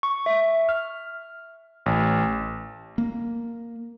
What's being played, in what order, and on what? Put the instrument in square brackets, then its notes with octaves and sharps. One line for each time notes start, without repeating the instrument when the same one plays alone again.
[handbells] C#6
E5
F6
[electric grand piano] A1
[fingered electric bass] A#3